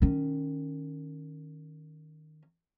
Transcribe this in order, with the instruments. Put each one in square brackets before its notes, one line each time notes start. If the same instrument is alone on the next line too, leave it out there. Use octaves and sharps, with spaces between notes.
[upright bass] D#3 C#4